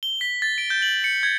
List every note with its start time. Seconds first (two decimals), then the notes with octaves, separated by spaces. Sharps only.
0.03 G7
0.21 B6
0.42 A6
0.58 D7
0.70 G6
0.82 F#7
1.04 C#7
1.23 G#6